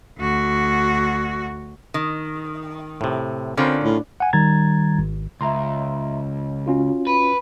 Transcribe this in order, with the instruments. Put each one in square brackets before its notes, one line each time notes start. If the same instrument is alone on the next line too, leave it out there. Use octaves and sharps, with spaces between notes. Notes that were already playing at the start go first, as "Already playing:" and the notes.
[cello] D2 F#4
[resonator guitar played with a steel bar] D#3
[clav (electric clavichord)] A2 C3
[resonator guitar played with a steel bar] D3 [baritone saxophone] C4 [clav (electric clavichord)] C#4 F4 A#4
[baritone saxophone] A2
[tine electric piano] F#5 G#5
D#3 G3 A#5 G#6 A6
G#1
[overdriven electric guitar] C#2 [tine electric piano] E5 A#5 C6
[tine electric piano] C#4 F4 F#4
[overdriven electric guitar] B4